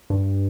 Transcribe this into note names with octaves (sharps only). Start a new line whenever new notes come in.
G2